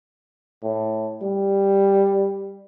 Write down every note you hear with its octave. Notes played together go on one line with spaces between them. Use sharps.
A2
G3